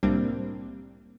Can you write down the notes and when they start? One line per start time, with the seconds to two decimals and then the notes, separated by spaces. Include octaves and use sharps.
0.03 C2 A2 G3 A#3 C4 D4